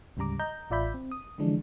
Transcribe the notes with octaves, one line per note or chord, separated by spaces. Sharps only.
D2 G#2 C#3 G3 A#5 D6
D#5 A#5 G6
A1 F4 D5 E5 B5 G6
C4
D#6
D3 E3 F3 G#3 D4